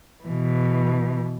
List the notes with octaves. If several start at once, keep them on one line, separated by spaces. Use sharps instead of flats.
B2 E3